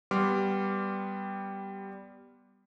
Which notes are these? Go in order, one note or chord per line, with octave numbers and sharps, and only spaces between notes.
G3 B3 C6 D6 F6